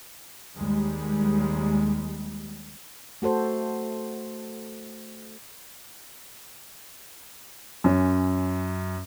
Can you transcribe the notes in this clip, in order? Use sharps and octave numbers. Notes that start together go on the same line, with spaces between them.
D#2 G3 G#3
A3 F#4 A4 C5
F#2 C#4